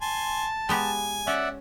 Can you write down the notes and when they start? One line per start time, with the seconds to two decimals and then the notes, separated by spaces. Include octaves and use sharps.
0.01 G#5 A5 C6
0.69 G#3 B3 G4 G#5
1.27 C#4 D5 E5 F#5